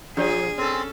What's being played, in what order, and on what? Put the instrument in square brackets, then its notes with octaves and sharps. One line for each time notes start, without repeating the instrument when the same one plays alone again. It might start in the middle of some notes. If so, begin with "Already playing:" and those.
[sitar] F3 [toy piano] D4 G4 D5 [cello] G#4
[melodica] C4 [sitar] C#4 A4